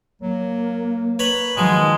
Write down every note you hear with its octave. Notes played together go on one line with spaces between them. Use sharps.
F#3 A#3
B4 C#5 A#5 B5
D#3 F3 F#3 G#3